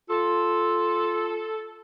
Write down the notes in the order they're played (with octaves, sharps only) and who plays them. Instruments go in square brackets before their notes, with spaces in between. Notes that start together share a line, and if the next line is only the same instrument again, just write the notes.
[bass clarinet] F4 [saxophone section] A4